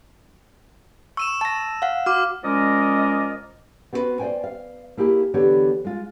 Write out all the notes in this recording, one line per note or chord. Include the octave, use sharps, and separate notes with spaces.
C#6 E6 D#7 E7
A5 A#6
F5 F#5
F#4 D6 F6
F3 G#3 C#4 A#4 D5 D#5
B3 C4 F#4 G4 B4
C5 D5 F5 G5 G#5
F5
A#3 E4 G4 G#4 D#5
D3 E3 B3 G4 C#5
G#3 F4